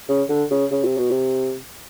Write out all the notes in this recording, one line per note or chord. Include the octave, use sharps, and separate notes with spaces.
C#3
D3
C#3
C#3
C3
B2
C3